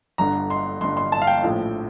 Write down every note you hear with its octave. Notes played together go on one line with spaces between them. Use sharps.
G1 G2 D3 A#5
C6
G1 G2 D3 C6
C6
A5
F5
G5
A#1 A2 F3